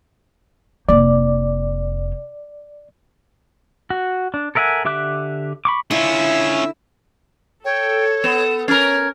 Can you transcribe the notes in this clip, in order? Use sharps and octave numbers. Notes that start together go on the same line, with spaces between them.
F1 A#3 D5
F#4
D4
A4 A#4 E5 F#5 G#5
D3 G4 E5 D6 F#6
B5 C#6 D6
D3 C#4 E4 F4 E5
A4 C#5 G5
B3 E7
C#4 A#4 C#5 G#6